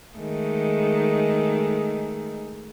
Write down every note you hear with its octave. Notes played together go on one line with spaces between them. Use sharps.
D#3 G#3 A3